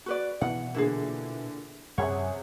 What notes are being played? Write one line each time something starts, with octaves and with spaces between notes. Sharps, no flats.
F#4 B4 D5
B2 E3 B3 F#5
A#2 D3 E3 E4 G#4
F#2 C3 G#4 C#5 F#5